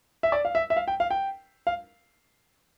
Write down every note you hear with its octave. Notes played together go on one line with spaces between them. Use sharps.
E5
D5
F5
E5
E5
F5
G5
F5
G5
F5